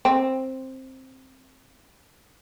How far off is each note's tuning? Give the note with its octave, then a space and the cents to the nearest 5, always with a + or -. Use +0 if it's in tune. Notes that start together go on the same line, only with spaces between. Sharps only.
C4 +10